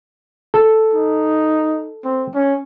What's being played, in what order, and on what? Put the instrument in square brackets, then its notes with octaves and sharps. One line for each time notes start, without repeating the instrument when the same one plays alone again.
[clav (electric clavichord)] A4
[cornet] D#4
C4
C#4